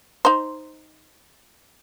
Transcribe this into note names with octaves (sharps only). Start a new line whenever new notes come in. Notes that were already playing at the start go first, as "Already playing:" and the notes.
D#4 C5